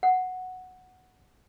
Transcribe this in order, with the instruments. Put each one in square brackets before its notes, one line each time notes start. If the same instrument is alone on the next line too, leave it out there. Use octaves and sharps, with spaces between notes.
[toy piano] F#5